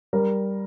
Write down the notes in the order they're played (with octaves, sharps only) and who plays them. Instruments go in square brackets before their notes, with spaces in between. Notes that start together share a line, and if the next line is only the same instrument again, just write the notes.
[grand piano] G3 A#4